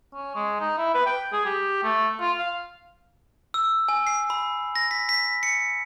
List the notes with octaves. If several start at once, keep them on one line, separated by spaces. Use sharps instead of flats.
C#4
G#3
D#4
E4
B4
G5
G#4
G4
A3
F4
F5
E6
G#5
C7
B5
A#6
B6
B6
C#7